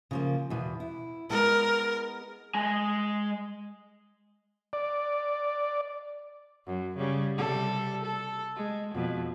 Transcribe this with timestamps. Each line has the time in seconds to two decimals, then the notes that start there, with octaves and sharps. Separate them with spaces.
0.11 C#3 F3 A#3
0.50 E2 B2
0.80 E4
1.30 G#3 B3 A#4
2.55 G#3 G#5
4.73 D5
6.66 F#2
6.97 C#3 G3
7.37 C3 G3 A4
8.05 A4
8.56 G#3
8.94 F2 B2